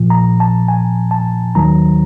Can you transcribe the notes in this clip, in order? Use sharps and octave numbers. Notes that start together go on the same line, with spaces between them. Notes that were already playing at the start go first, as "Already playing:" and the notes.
Already playing: A#1 A#2 F3
A#5
A5
G#5
A5
D#2 D#3 F#3 A#5